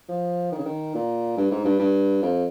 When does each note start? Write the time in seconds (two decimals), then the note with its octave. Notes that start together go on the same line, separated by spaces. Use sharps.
0.08 F3
0.52 D#3
0.58 C#3
0.65 D#3
0.95 A#2
1.37 G2
1.51 G#2
1.65 G2
1.79 G2
2.22 F2